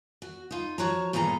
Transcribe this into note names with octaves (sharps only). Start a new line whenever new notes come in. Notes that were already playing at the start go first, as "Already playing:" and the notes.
F#4
D#4 F4
F3 F#4 C#5 A5 A#5
G2 A#2 B3 G#4 A4 A#5